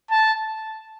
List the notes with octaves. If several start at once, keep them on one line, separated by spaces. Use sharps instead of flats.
A5